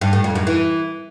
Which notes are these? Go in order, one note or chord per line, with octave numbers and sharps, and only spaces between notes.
G2
A2
F2
F#2
E3